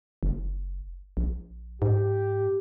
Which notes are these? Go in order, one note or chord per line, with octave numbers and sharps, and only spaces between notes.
F#1
A#1
G#2 G4